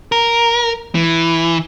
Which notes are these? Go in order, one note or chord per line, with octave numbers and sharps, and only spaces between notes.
A#4
E3